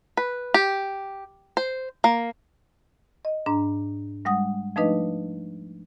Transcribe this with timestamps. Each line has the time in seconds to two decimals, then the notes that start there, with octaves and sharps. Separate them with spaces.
0.17 B4
0.54 G4
1.57 C5
2.04 A#3
3.25 D#5
3.46 G#2 D4 A#5
4.25 G3 G#3 F#5 D#6
4.76 F3 A3 D4 D#4 B4 D#5